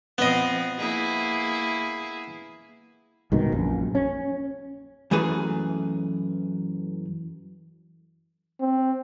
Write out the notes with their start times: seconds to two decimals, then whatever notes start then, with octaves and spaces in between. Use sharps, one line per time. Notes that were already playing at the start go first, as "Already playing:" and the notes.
0.18 F3 B3 C4 D#5
0.78 A#3 E4 G#4
3.32 C2 G#2 B2 D#3
3.52 A#1 F#2
3.95 C#4
5.11 F#2 E3 A3 G#4 B4
8.60 C4